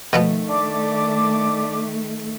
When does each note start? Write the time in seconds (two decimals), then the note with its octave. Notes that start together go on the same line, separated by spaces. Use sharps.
0.13 B2 D#3 F3 A3 B3
0.49 D4 D5 D6